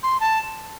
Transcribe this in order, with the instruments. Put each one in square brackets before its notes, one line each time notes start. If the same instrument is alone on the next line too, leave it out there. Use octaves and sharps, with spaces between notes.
[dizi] C6
A5